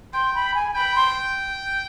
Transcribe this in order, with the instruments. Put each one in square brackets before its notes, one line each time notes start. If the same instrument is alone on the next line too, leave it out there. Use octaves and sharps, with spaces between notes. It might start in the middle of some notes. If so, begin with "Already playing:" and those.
[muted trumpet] G5 [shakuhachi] C6
[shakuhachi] B5
G#5
[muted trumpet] G5 [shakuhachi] B5
[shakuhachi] C6